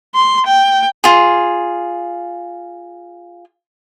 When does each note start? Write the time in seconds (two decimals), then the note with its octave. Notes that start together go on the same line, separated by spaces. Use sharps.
0.15 C6
0.46 G5
1.04 F4 G#4